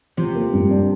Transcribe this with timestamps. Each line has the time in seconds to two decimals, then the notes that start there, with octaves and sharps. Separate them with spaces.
0.17 C3 F3
0.35 A#3
0.53 G2
0.71 D4